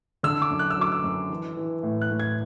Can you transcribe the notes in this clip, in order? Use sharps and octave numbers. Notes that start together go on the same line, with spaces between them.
D3 E6
D6
F#2
F#6
E6
F#3 D6
E6
F#2
E3
E3
A2
F#6
A2
G#6